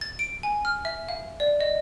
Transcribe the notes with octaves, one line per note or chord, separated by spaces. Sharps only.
A6
D7
G#5
F6
E5
F5
D5
D#5